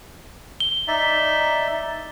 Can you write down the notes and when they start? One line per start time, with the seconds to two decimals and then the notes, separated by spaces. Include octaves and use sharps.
0.60 G7
0.87 D#4 D5 E5